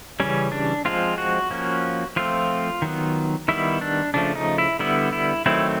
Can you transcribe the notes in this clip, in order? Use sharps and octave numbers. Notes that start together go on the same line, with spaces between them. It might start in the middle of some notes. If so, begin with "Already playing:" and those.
C#3 E3 G3 C#4
D4
F3 G#3 C4 F4
F#4
F3 A#3 C#4
F3 A3 C4 F4
D#3 F#3 B3
D#3 G3 B3 E4
D4
C#3 F3 A3 D4
D#4
E4
D3 G3 B3 E4
E4
D#3 F#3 A3 C4 E4